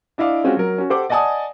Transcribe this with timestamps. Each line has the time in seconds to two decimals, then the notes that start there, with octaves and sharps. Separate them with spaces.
0.18 D4 E4 D#5 F5 D6
0.44 G#3 C4 C#4 F4 F#4
0.57 F#3 A#4
0.78 C#4 F#4
0.90 G4 A4 C5 F#5 D6
1.09 D5 D#5 F#5 G#5 A5 D#6